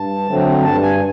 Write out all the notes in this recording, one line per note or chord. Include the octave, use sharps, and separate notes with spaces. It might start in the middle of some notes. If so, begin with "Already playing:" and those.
Already playing: G2 A5
D3 F#3 A3 C4
G2 A5
G#5